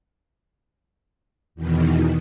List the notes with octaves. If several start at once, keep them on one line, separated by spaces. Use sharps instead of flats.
E2 B2 D#3 E3